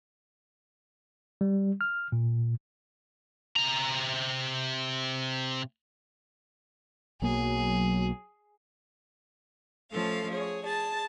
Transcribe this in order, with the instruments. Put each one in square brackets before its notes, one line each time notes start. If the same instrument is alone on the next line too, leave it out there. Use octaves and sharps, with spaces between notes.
[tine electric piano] G3
F6
A#2
[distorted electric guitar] C3 A#5
[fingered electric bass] B1 A#3 [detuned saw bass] F#3 [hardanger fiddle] G#4
[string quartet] F3 A3 C#4 A4 F5
G#4 C#5
G#4 A5 A6